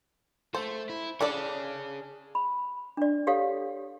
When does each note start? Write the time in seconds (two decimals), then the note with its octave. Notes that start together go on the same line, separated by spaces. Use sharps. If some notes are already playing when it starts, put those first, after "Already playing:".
0.54 A3 A4 C5
0.89 E4
1.21 D4 G#4 A4 C#5 D5
2.35 B5
2.97 D4 D5
3.27 G4 A4 C#5 F5 D#6